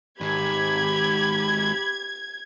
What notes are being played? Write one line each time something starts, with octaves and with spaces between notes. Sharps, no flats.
G#2 D#3 G4 B5 G#6